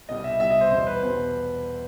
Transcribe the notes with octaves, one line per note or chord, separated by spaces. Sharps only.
C2 B2 G3 D#5
E5
C2 B2 G3 E5
D#5
C5
E2 B2 G3 C5
B4
E2 B2 G3 C5